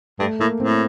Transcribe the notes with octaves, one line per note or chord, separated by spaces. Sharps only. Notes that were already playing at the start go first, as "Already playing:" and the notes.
G2 A3
A2 A#3
A2 C4